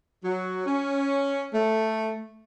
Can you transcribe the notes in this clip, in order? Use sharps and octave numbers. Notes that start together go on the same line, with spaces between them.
F#3
C#4
A3